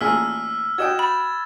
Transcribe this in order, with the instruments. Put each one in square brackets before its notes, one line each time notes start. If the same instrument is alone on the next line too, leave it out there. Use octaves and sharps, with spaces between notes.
[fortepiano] A1 A#2 G#4 [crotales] E6 F6 B6
[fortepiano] F#4 D#5 G5 [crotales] G#6 E7
[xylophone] B5 [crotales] A6